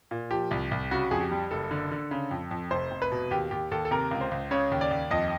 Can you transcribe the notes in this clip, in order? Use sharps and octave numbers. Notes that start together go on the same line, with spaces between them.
A#2
F3 G4
C2
C2
C#3 F#4
F2 G#4
G4
G3
F#1 A4
D3
D3
C#3
F2
F2
F1 C5
F1
B4
B2
D#2 G4
D#2 G4
D#2 A4
A4
C3 A#4
C#2
C5
C#2
C#3 C#5
D#2
D5
D#2
F2 D#5